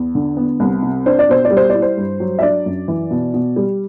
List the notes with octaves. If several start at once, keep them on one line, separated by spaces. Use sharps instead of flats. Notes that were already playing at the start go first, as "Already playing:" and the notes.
Already playing: E2
D3
B3
C2
C3
D4 C5
D5
B2 C5
D5
G3
C5
D5
E4
C5
G2
F#3
E5
D4 D5
F#2
E3
B2
B2
G3